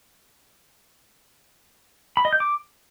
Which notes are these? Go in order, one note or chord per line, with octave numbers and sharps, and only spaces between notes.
B5
D#5
G6
D6